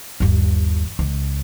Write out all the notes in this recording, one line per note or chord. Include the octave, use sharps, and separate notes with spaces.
G1 D#2
C#2